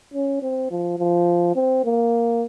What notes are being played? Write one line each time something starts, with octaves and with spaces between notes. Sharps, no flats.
C#4
C4
F3
F3
C4
A#3